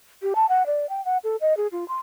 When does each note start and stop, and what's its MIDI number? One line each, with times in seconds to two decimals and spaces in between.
0.22 0.33 67
0.35 0.46 81
0.49 0.66 78
0.66 0.88 74
0.89 1.04 79
1.05 1.18 78
1.24 1.36 69
1.41 1.56 75
1.57 1.67 68
1.72 1.87 65
1.88 1.98 84